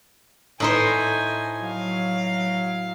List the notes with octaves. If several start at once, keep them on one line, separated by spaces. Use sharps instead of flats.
A2 D#4 C5 G#5
F#3 F5